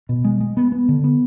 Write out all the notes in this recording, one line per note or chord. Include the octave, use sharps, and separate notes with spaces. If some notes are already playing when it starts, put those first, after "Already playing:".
B2
G#3
G#3
B3
B3
D3
B3